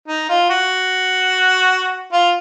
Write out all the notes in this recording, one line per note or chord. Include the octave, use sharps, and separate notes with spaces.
D#4
F4
F#4
F4